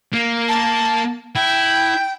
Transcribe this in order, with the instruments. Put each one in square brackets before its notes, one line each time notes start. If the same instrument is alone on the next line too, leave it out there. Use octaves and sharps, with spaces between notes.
[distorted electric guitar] A#3
[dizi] A5
[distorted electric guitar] E4 [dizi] G5